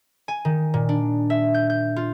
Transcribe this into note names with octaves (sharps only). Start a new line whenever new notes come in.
G#5
D#3
A#2
D4
E5
G6
G6
F4